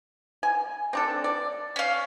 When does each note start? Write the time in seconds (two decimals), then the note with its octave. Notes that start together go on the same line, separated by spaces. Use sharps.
0.43 G#5
0.93 C4 D4 A4
1.24 D5
1.76 C#4 F5